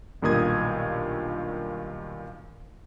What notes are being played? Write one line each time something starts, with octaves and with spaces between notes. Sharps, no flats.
B1 G2 A#2 D#3 D#6 G#6